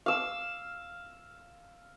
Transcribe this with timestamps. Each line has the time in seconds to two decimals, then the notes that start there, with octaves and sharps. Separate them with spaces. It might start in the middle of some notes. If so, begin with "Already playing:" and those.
0.06 F5 E6